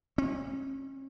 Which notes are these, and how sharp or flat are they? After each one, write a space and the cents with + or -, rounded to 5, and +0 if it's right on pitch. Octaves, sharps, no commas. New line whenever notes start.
C#4 -40